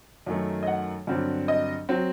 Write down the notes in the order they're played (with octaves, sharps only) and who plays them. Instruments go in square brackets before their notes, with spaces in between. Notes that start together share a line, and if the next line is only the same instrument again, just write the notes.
[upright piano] F#2 D#3 A3
D#5
F#5
G2 D3 F#3 C4
D#5
F#3 C4